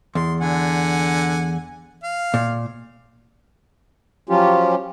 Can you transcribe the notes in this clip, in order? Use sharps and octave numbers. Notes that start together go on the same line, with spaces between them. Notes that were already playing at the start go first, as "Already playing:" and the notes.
E2 C6
D3 F#5 G#5
F5
A#2
F3 F#3 C#4 F4 G4